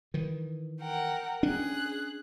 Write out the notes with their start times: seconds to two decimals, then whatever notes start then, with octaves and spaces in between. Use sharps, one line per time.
0.14 D#3 E3
0.82 A#4 F#5 G5
1.43 C#4 D4 G#4 F#6